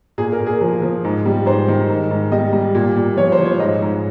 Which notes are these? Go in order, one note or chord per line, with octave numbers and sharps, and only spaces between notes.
A#2 G#4
A#4
A#2
G#4
F3 G#4
F3
G#2
G3
G#2 C5
D#3
G#2
G#2
G3 D#5
G3
A#2
A#2
F3 C#5
C5
F3
C#5
G#2 D#5
G#2